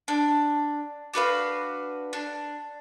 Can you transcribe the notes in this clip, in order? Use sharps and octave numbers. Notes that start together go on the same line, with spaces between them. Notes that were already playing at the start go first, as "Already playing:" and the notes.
D4
D4 F#4 B4 F5
D4